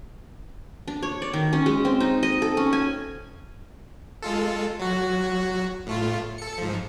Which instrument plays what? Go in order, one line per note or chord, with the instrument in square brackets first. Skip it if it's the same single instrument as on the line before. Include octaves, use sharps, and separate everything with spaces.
[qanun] D4
C#5
D5
D#3
C#4
G#3
C4
D#4
D#5
A4
C#4
G#5
[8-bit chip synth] G#3 F4 A4
F#3 F#4
A2 A3 F4
A4 C#7
G#2 F3